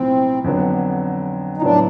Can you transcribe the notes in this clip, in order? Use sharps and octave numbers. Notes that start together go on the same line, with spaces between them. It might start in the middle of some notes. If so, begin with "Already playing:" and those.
Already playing: B1 A2 F3 C4
F2 D3 F#3 B3
D#4
A2 F#3 B3 D4